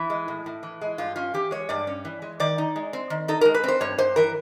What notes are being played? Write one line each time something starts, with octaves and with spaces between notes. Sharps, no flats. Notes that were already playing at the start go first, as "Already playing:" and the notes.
Already playing: E3 E4
G#3
A2
A2
E3
G#3
G2 F4
C#4 F4
E3 G4
G#3 C#5
G2 D5
C#4
E3
G#3
D#3 D5
D#4
G#3
C4
D#3
D#4 A4
G#3 A#4
B4
C4 C5
G2 C#5
G2 C5
E3 A#4